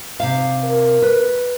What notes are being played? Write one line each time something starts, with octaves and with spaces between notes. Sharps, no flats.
C3 F5
A#4
B4